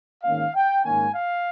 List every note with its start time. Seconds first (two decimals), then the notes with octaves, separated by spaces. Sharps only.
0.24 G#2 D#3 A#3 C#4 F5
0.55 G5
0.84 G#2 D#3 A#3 C#4 G#5
1.15 F5